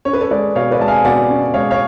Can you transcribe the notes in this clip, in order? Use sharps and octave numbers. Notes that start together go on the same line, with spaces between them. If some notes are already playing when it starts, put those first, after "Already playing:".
C#4 C#5
B4
A4 C#5
G#3 B4 D5
B2 C#5 F5
B4 D5
G#3 A5
F5 G#5
B2 D5 F#5
C#4
G#3 C#5 F5
C#5 F5